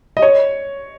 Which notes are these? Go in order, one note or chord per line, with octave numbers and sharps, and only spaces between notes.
D#5
C#5